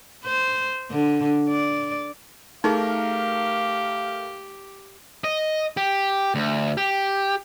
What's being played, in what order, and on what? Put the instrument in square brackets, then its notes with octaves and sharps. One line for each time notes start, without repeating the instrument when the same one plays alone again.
[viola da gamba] C5
D3
D5
[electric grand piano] A3 A#4 [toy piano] D#4 G#4 [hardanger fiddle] G4 [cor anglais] F5
[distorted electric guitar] D#5
G4
D2
G4